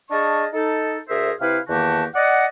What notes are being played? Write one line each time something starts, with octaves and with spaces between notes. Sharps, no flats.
D4 G#4 D#5 F5 A5 C#6
D#4 A4
D2 G#4 A#4 C5 E5
C3 E4 B4 F5
E2 D#3 A#3 F#4 G4 A5
D5 D#5 F#5